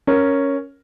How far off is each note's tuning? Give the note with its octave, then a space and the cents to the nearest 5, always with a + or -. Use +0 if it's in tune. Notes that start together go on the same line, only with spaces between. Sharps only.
C#4 +0 A#4 +0